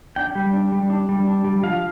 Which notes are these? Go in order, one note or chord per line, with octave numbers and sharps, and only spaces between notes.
D4 G5
G3
D4
G3
D4
G3
D4
G3
F3 F5